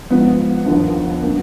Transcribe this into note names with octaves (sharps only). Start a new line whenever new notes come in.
G#2 F3 B3
D#2 D3 F3
D3 F#3 A#3